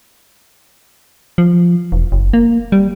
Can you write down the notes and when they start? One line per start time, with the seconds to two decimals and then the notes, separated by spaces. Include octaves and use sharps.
1.38 F3
1.92 E1
2.12 F#1
2.33 A#3
2.72 G3